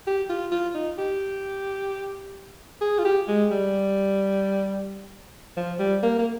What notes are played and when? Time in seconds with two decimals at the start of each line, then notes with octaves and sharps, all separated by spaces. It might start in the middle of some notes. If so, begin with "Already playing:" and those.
0.07 G4
0.29 F4
0.51 F4
0.74 D#4
0.98 G4
2.81 G#4
2.99 F4
3.05 G4
3.28 G#3
3.51 G3
5.57 F3
5.79 G3
6.03 A#3
6.18 A#3